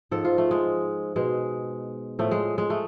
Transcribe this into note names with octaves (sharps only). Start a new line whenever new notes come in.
G#2 F3 A4
F4
A3
G#3
B2 G#3
A2 F3 A3
G#3
G#3
A3